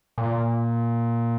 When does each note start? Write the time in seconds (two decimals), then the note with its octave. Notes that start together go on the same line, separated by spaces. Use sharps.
0.18 A#2